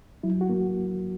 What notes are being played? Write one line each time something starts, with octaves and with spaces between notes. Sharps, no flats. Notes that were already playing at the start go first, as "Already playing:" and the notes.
F#3 E4
F#4
A#3